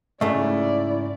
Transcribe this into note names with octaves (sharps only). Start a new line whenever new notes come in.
G#2 C#3 A3 E4 D5